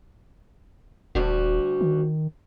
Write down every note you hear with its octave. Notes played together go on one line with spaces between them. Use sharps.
D#1 D2 G3 F#4
D#3